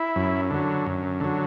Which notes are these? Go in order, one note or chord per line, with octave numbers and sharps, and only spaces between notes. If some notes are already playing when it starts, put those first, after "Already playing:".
Already playing: E4
F#2
D3 F#3
F#2
D3 F#3